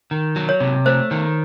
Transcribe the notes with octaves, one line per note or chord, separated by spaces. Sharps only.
D#3
F#3
C#5
C3
A3 C5
D#3